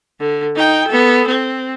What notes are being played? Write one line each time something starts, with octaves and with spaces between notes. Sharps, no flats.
D3
D#4 G5
B3 A4
C4